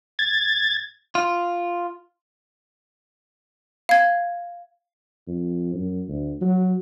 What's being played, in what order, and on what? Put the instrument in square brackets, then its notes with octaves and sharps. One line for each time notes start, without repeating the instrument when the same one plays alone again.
[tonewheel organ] G#6 A6
[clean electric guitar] F4
[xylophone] F5 G#6
[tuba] F2
F#2
D2
F#3